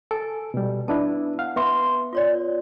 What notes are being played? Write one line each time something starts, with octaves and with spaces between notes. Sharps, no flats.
A4 G#5
B2 G3
B3 D4 E4 A5
F5 F#5
B3 E5 F5 C6
F4 C#5 D5